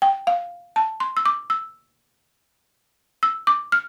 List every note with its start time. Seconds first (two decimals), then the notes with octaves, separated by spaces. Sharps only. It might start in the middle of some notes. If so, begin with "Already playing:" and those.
0.02 G5
0.27 F5
0.76 A5
1.00 C6
1.17 E6
1.26 D6
1.50 E6
3.23 E6
3.47 D6
3.72 F6